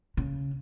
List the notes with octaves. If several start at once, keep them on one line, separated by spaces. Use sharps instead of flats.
C#3